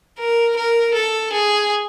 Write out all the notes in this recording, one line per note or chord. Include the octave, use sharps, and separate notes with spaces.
A#4
A#4
A4
G#4